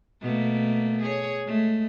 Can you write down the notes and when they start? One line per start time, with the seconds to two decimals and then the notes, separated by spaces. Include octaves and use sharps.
0.21 B2 A3 A#3
1.02 G#4 C#5
1.46 G#3 A3